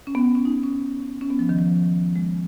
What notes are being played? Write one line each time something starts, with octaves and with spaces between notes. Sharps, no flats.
C#4
B3
C#4
C#4
D#4
C#4
C#4
B3
F3
D#3
F3
G#3